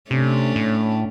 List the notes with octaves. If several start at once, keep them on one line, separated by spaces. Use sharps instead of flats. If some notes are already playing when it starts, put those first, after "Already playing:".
C3 A3 C#4 D4
A2